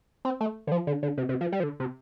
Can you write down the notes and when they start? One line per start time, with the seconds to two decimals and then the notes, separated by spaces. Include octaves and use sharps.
0.25 C4
0.41 A3
0.67 D3
0.72 F3
0.87 D3
1.03 D3
1.18 C3
1.29 C3
1.41 F3
1.52 G3
1.60 F3
1.63 D3
1.80 C3